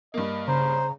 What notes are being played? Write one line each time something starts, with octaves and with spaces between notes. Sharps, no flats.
G2 A#3 D#5
C#3 C5 A#5